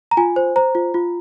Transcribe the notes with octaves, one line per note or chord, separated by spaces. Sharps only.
A#5
F4 G#5
C5
C5 A#5
F4
F4